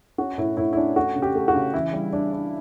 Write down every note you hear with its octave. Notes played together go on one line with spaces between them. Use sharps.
C#4 F#4
A2 E4
A2 E4
E4
C#4 D4
A3 F#4
C#3
G4
A3
F#4
C#3
E3 E4
G3
D4
D4